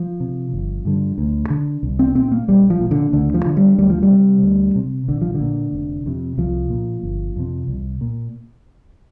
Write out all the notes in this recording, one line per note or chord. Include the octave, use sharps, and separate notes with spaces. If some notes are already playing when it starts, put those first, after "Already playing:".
Already playing: F3
C3
G1
G2 D3
D2
D3
C2
C4
A#2 C4
A#3
A#1 G3
F3
A#2
D3
D2 D3
F3
D3
G3
D2 G3
F3
G3
C3
D2
C3
A#1 D3
F3
D3
A#2
F1
F2 C3
C2 F3
A#2
G1
F2 C3
C2
A#2